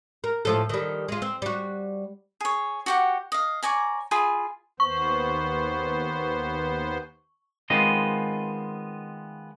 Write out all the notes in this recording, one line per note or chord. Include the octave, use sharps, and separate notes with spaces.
A#4
A2 F3 A4
D#3 G3
G#3 F4
C4
G3 F#4
G#4 C#5
F#4 G4 F#5
D#5 F5
C#5 D5 G#5 A#5
F4 G#4 G#5 B5
D#2 B3 C5 C#6
D#3 G#3 B3 C4 F4 D#5